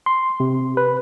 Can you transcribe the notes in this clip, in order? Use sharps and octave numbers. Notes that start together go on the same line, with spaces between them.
C6
C3
B4